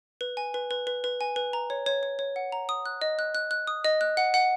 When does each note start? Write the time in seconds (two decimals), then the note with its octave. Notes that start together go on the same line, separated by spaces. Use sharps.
0.21 B4
0.37 G#5
0.54 B4
0.71 B4
0.87 B4
1.04 B4
1.21 G#5
1.36 B4
1.53 A#5
1.70 C#5
1.86 C#5
2.03 C#5
2.19 C#5
2.36 F#5
2.52 A#5
2.69 D#6
2.86 F#6
3.02 D#5
3.19 F#6
3.35 F#6
3.51 F#6
3.67 D#6
3.85 D#5
4.01 F#6
4.17 F#5
4.34 F#5